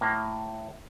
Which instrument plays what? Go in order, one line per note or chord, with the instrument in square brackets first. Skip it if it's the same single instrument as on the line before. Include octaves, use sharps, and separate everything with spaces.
[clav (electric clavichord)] A2 A#3